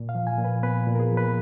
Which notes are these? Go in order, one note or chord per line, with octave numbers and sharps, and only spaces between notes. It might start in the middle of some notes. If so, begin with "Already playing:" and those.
Already playing: A#2
F5
F3
G#5
A#2
B4
B3 B4
A#2
A#4
G#4
F3
B4